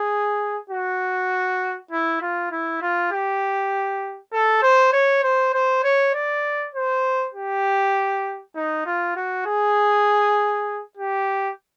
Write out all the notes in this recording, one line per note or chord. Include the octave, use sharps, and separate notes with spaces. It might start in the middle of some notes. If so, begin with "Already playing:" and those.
Already playing: G#4
F#4
E4
F4
E4
F4
G4
A4
C5
C#5
C5
C5
C#5
D5
C5
G4
D#4
F4
F#4
G#4
G4